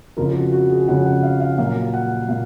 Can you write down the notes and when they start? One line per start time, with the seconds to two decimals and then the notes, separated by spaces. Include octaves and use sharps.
0.17 F2 C#3 F3 A#4
0.35 F#4
0.52 F#4
0.70 G#4
0.88 F2 C#3 F3 F#5
1.06 F#5
1.23 F5
1.40 F5
1.58 A#2 F#3 A#3 F5
1.94 F#5
2.28 A#2 F5